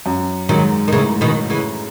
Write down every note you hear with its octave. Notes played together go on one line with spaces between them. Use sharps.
F#2
G#2 D#3 F#3
D#3
A2 C#3 E3
B2 D#3
C#3 E3